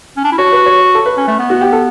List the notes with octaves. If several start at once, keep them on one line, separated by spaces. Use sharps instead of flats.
C#4
D4
E4
F#4 C#5
B4
C#5
A4
B4
C#4
A3
B3
F#4
G4
A4